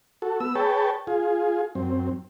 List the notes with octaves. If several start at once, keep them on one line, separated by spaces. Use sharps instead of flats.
F#4 A4
B3 E6
G#4 B4 C#5 G5 A5
F4 G#4
F#2 C4